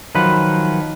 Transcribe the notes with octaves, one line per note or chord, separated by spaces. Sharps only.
D#3 F3 F#3 B4